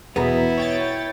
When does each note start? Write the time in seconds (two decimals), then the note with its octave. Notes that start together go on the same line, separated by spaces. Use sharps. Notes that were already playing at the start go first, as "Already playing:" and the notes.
0.16 E2 B2 B3 E4 G#4 A#5
0.57 C#5 G5 A6